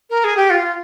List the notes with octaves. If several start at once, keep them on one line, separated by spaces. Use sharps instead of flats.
A#4
G#4
G4
F4